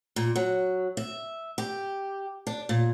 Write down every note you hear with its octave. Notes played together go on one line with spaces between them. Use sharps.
A#2
F#3
E5
G4
D4
A#2